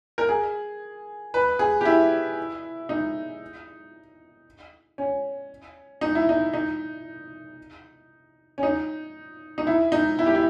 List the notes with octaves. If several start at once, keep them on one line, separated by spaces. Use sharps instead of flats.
A#4
G#4
B4
G#4
G4
E4
D#4
C#4
D#4
E4
D#4
D#4
C#4
D#4
D#4
E4
D#4
E4
G4
E4